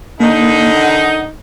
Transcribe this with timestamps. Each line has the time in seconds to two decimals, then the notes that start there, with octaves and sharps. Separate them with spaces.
0.20 D3 D#3 A#3 D#4
0.77 F#5